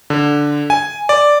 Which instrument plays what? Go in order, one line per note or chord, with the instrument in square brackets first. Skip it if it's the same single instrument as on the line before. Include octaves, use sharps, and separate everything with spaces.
[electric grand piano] D3
G#5
D5